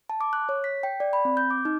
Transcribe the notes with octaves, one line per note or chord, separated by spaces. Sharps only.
A5
D6
F#6
C#5
B6
G5
D5
B5
C4
G6
D6
D#4